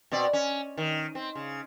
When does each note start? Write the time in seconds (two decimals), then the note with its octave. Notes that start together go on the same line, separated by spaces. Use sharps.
0.12 B2 C4 D5
0.33 C#4
0.77 D#3
1.15 C4
1.35 C#3